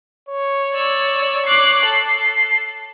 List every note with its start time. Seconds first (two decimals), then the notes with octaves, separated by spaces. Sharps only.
0.29 C#5
0.74 D5 E6
1.46 D6 F#6 C7
1.85 A4